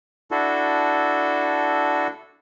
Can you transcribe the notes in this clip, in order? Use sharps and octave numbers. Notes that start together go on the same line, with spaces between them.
D4 E4 F#4 A4